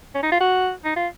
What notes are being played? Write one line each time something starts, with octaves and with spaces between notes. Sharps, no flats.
C#4
D#4
F4
F#4
D#4
F4